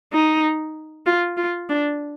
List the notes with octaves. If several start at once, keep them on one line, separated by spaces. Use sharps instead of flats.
D#4
F4
F4
D4